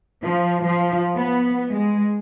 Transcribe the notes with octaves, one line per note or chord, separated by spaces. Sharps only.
F3
F3
B3
G#3